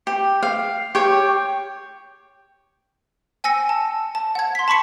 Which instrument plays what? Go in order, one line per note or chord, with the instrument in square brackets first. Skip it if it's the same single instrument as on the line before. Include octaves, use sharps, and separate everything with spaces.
[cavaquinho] G4
F5
G4 C#5 G5
[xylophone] G5 G#5 E6 A#6 C#7
A5
A5
F#5 G#6
C6 B6
A5 B5 C#6 B6 C#7